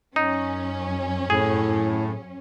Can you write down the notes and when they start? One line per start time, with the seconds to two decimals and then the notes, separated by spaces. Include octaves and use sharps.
0.16 F#2 C#4 D#4
1.30 A2 G#4